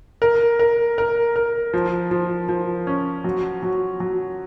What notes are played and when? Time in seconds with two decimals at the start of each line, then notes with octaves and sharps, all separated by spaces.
0.22 A#4
0.59 A#4
0.98 A#4
1.36 A#4
1.74 F3
2.11 F3
2.49 F3
2.87 C#4
3.24 F#3
3.63 F#3
4.00 F#3